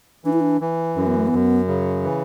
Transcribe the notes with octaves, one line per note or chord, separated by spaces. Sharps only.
E3 D4
E4
D4
E3
F#2 C#4
B3
A3
B3
F#2
C#3
E3